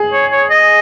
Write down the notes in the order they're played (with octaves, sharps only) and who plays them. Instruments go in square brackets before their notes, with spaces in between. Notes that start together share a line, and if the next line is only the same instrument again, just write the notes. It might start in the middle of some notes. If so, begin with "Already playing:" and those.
Already playing: [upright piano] G#4
[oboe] C#5
C#5
D#5